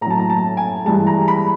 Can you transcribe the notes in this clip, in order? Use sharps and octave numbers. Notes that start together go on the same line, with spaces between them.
A2 A#5
F#3 A5
A#5
A5
G#5
G2 E3 G#3 A5
A#5
B5